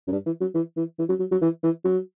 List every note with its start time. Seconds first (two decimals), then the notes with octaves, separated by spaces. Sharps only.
0.07 F#2
0.12 G2
0.26 E3
0.41 F#3
0.55 E3
0.77 E3
0.99 E3
1.09 F#3
1.19 F#3
1.31 F#3
1.41 E3
1.63 E3
1.85 F#3